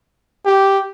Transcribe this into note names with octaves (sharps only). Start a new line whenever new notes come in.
G4